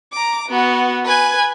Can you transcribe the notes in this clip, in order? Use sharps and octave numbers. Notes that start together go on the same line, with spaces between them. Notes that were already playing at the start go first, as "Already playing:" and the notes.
A#5 D6
B3 F#4
B4 G#5